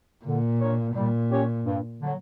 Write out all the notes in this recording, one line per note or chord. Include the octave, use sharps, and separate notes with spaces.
A#2 D3
A#3 D4 A#4 C#5
A#2 G3
C#4 G4 C#5
G2
D3 F#3